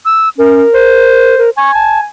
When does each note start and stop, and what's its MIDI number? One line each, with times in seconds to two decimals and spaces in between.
0.05 0.29 88
0.38 0.64 61
0.38 1.35 70
0.74 1.49 72
1.38 1.50 70
1.57 2.05 80
1.57 1.72 85
1.74 1.99 81